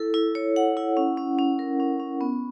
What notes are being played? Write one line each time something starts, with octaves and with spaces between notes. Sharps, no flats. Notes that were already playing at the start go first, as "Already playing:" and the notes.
Already playing: E4 A4
E4
C#5
F#5
E4
C#4
C#4
C#4
A#4
C#4
C#4
B3